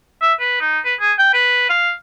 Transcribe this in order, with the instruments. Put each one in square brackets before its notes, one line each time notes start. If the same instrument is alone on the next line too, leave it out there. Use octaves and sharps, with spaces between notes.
[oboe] E5
B4
D#4
B4
G#4
G5
B4
F5